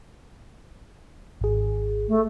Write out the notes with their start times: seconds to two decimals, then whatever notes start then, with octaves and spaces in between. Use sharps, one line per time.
1.41 G#1 G#4
2.08 A3